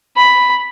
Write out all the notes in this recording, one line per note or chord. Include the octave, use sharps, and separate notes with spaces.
B5